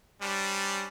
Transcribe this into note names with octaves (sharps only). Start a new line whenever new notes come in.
G3 C#4 D4 C5